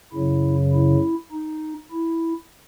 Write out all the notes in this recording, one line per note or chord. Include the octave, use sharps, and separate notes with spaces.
F#2 C#3 F#3 E4
E4
D#4
E4